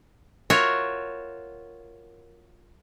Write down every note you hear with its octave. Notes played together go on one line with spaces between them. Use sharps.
F4 F#4 A#4 C#5 E5